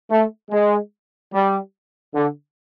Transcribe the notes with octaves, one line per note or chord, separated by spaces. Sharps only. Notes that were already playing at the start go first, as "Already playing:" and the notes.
A3
G#3
G3
D3